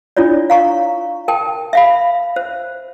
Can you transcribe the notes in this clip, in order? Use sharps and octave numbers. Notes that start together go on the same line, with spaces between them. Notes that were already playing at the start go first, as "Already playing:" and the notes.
D4 E4 F4 C#5 D5
F5 A#5 C#6
A#4 G5 A5
E5 F5 B5
C5